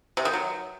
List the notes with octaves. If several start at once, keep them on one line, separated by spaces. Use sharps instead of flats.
C3
D#3
F#3